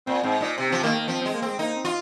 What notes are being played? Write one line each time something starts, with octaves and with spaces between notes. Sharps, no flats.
A#2 C4
G#2 C4
A#2 D#4
C3 C4
F3 C4
D#3 A#3
A#3
F3 C4
C4
G#3
A#3
G#3 C4
A#3 D#4
C4
F4